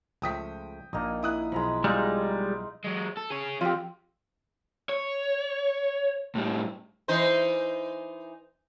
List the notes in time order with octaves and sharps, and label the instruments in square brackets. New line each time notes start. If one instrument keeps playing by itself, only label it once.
[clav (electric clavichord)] C#2 F3 A3 [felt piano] G5 D#6 B6
[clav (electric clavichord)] A#1 A#2 [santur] A#3 D#4 D#5
[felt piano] E4 D#6 F#6
[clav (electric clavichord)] B1 F3 [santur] G#3 A#5 B5
[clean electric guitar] G3 G#3 [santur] D#4 F4 D#5
[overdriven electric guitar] F#3 G#3
A4
G#4 C#5
[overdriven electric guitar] F2 [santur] F4 G4
[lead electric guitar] C#5
A2 G3
[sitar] E3 D#4 C5